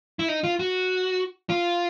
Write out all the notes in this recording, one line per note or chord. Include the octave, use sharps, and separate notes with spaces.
E4
D#4
F4
F#4
F4